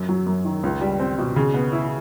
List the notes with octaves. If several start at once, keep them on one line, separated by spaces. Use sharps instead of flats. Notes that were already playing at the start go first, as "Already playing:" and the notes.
Already playing: F#2
F#3
F#2
D#3
C#2
G3
C4
B2
C#3
B3
E4